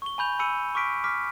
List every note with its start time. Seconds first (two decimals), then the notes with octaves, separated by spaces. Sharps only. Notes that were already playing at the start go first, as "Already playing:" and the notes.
0.02 C#6 G7
0.18 G#5 B5 G6 F7
0.39 G#5 B5 E6 C#7 D#7
0.75 C#6 D6 F6 B6 D7
1.04 D6 F6 B6